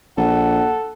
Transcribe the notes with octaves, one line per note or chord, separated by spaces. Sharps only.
A#1 A4 F#5